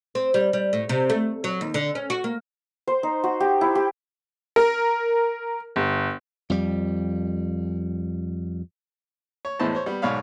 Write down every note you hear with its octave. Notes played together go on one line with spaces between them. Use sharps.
C4
G3
G3
A2
C3
A3
F#3
D#2
D3
C#4
F#4
A#3
C5
D#4
F#4
G4
E4
G4
A#4
G1
F2 G3
C#5
E2 A2 E3 G#3 C5 A5
C5 C#5
G3 B3
B1 G#2 C#5 D5 F5 B5